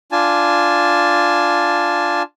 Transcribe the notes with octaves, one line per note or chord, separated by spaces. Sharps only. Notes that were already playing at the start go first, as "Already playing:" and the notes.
D4 F4 G#5 A5